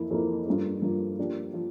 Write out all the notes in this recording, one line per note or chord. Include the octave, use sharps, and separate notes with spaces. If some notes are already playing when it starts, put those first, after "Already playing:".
Already playing: F2 E3 A#3 E4
F2 E3 A#3 E4
G2 F3 A#3
G2 F3 A#3
F3 A#3 D4 G4
F3